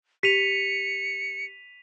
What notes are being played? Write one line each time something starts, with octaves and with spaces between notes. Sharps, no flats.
G4 B6 C#7 D#7 F7